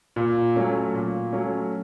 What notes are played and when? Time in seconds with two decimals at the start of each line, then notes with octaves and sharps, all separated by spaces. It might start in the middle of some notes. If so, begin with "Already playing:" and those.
0.16 A#2
0.56 F#3 A3 C#4
0.94 A#2
1.32 F#3 A3 C#4